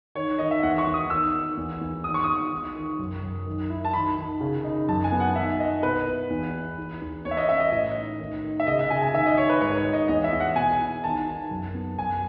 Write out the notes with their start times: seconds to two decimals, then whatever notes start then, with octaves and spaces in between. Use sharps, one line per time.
0.15 D#3 C#5
0.39 D#3 D#5
0.51 E5
0.63 E2 F#5
0.78 C#6
0.87 E2
0.94 D#6
1.10 D#3 E6
1.34 D#3
1.57 E2
1.81 E2
2.04 D#3 D#6
2.14 C#6
2.24 D#3 D#6
2.52 D#3
2.76 D#3
2.99 F#2
3.23 F#2
3.46 D#3
3.70 E4
3.85 A5
3.93 D#3 B5
4.18 D#3
4.41 C#3
4.64 D#4
4.88 F#2 A5
5.04 G#5
5.12 B3
5.20 F#5
5.36 D#3 E5
5.60 D#4 D#5
5.83 B2 B4
6.06 E4
6.30 E2
6.54 E4
6.78 E2
7.02 E2
7.25 E2 C#5
7.31 E5
7.37 D#5
7.49 C#4 E5
7.60 D#5
7.72 A2 D#5
7.96 D#4
8.20 D#3
8.44 D#3
8.60 E5
8.67 C#3 D#5
8.79 E5
8.90 C#3 G#5
9.02 G#5
9.14 D#3 E5
9.26 D#5
9.37 D#3 C#5
9.49 B4
9.61 G#2 C#5
9.77 C#5
9.85 D#4
9.93 D#5
10.08 E2 D#5
10.24 E5
10.32 E2
10.40 F#5
10.56 B2 G#5
10.79 E4
11.03 D#3 A5
11.27 D#3
11.51 F#2
11.75 B3
11.98 F#2 G#5